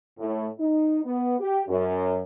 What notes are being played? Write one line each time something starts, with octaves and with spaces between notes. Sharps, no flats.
A2
D#4
B3
G4
F#2